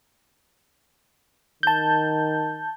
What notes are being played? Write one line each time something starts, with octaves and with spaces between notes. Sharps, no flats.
D#3 A5 G6